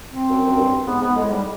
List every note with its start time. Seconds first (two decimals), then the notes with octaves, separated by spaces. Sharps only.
0.10 C4
0.29 F#2
0.46 F#2
0.58 G2
0.86 G#2 B3
1.01 G#2 B3
1.16 A2 G#3
1.31 G#2 G3